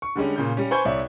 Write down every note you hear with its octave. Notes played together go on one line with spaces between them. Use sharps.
C#6
D3 G3 G#3 C#4
A#2 C#3 G6
G3 C#4
B4 C5 G#5 C#6 G6 G#6
C2 C#5 D5 E5